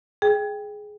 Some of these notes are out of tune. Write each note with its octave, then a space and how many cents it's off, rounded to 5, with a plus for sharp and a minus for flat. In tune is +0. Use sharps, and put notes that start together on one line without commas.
G#4 +10 G5 +15